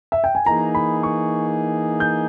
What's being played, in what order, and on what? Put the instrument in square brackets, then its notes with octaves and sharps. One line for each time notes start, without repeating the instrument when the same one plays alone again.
[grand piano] E5
G5
G#5
[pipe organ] E3 A#3 D#4 G#4 [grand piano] A#5
[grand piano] B5
C#6
G6